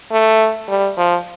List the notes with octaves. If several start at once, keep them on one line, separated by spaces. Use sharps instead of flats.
A3
G3
F3